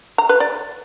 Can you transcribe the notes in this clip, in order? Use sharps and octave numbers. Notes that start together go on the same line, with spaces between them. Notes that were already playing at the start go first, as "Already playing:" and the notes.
A#5
B4
D5